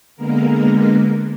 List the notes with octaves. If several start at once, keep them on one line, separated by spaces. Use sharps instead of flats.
D3 G#3 A#3 B3 A#4